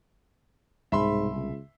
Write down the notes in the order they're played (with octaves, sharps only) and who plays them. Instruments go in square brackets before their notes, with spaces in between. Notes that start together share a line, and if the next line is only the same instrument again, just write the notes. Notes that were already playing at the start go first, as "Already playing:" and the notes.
[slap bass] C2 B2 [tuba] G#2 [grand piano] E5 B5 C6
[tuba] C#2